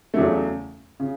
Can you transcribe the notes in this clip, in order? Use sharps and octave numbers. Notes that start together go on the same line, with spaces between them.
E2 C#3 F#3 A3
C#3